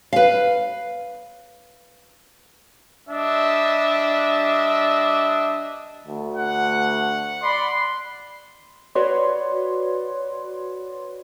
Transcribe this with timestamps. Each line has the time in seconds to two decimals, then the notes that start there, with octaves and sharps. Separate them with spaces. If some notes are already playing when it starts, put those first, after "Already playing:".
0.13 B4 F5
3.08 G3 D4 D#5 E5
6.07 D2
6.36 F#5
7.41 D5 B5 C6
8.95 F#4 B4 C#5 D5 C6